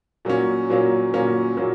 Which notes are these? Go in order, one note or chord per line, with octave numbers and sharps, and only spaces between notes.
A#2 F#3 A#3 C#4
A#2 F#3 A#3 C#4
A#2 F#3 A#3 C#4
A#2 F#3 A#3 C#4